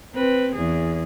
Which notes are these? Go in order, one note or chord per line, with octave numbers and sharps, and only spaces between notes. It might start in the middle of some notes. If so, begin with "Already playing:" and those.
C4 B4
E2 G#4